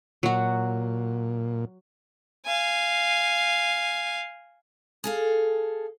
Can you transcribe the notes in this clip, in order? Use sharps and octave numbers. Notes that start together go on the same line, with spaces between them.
A#2 F#3 F#4
F5 G#5
G#4 A4 F5